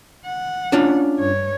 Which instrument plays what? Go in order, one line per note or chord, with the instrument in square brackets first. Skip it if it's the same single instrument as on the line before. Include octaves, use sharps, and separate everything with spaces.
[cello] F#5
[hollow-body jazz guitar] C#4 D4 F4
[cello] G2 C#5